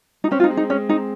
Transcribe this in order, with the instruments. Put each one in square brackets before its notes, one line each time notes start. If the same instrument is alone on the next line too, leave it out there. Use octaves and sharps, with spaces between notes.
[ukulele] D#4
[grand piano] C4 [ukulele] C#4
[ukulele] F4
D#4
[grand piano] G#3
[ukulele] D#4
[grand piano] G#3 [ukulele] C#4
[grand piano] C4 [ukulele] D#4